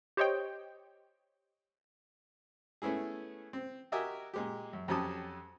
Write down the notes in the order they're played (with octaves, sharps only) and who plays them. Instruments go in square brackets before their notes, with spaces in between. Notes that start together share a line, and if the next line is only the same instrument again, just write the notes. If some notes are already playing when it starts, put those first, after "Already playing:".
[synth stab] G4 C5 C#5 D#5 G5
[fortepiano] A3 B3 C#4 E4 G#4
C4
F#4 G4 A#4 D#5 E5 G#5
A#2 G#3 G4
F#2
F2 F#3 C#4 G4 A5 D#6